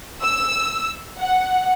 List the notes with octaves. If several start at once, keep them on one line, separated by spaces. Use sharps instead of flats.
E6
F#5